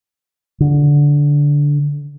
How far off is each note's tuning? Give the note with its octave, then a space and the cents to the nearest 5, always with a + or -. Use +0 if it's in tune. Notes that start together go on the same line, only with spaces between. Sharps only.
D3 -10